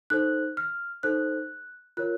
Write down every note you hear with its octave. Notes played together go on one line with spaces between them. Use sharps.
D#4 A4 C5 F#6
F6
D#4 A4 C5 F#6
F4 A#4 C#5 F#6